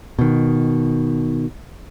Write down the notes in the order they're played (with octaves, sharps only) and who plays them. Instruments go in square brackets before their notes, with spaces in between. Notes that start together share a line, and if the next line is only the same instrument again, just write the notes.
[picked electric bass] B2 D#3